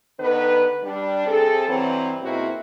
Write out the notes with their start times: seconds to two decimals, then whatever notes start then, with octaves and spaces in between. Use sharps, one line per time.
0.19 D3 D#3 B3 B4
0.83 G3 D4
1.26 C3 C4 G#4 A4
1.67 G2 E3 F#3 C4
2.21 G#2 B2 A#3 C4 E4 F#4